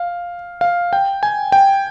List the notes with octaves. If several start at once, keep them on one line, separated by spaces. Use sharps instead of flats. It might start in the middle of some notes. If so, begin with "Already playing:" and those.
Already playing: F5
F5
G5
G#5
G5